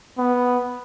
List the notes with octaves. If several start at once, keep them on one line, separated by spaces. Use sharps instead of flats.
B3